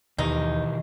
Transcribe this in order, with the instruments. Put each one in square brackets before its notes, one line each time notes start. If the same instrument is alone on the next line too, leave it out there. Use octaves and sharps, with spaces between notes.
[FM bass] D#2 [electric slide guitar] B2 E3 G4 [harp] D#3 [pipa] D#4